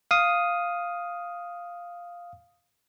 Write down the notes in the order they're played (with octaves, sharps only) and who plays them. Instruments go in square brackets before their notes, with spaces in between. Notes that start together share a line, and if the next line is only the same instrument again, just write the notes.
[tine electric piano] F5 D#6